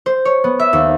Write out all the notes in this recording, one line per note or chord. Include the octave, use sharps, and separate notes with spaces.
C5
C#5
B3
E5
D#2